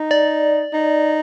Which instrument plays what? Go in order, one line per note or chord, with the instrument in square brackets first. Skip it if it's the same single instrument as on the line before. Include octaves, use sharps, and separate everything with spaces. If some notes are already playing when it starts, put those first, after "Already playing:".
Already playing: [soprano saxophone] D#4
[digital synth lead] D5
[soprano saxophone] D#4